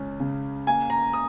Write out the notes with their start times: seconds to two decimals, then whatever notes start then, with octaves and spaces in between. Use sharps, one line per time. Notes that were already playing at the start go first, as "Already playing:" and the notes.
Already playing: C#2 C#4
0.20 C#3
0.67 A#3 G#5
0.90 A#5
1.13 D#6